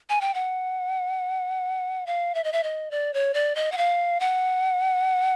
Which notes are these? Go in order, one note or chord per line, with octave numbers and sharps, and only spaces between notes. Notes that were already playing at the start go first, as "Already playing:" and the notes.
G#5
G5
F#5
F5
E5
D#5
E5
D#5
D5
C#5
D5
D#5
F#5
F5
F#5